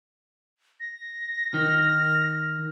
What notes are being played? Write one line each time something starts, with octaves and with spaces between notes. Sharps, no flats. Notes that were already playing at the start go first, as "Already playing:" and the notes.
A#6
D#3 F6